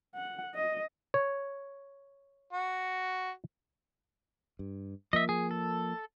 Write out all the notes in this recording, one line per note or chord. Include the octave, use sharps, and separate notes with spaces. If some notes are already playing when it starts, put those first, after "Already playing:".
F#5
D#5
C#5
F#4
G2
F3 A#3 D#5 E5
G#4
A4